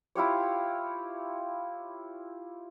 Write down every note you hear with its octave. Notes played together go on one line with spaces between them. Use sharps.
E4 F4 G4 C#5